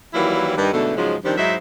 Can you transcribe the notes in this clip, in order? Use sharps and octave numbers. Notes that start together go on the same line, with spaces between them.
D#3 E3 F#3 G3 A#3 E4
G2 D#3
G#2 B2 D3 E3 A3
G#2 C#3 F3 F#3 G#3
D#3 F3 G3 C4 D4
G#2 F#3 D#4 E4 C5 E5